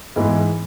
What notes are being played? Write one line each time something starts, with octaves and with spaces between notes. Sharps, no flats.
G#2 E3 G#3 B3